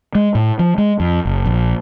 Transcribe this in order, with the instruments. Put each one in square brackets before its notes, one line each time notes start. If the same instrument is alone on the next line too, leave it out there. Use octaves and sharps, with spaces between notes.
[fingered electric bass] G#3
A2
F3
G#3
F2
F#1
A#1